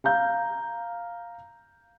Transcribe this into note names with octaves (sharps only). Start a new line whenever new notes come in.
F5 A#5 G6